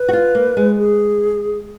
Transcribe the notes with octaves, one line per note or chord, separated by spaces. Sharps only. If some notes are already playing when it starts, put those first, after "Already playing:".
Already playing: B4
F#4
F4
A#3
G#3
G#4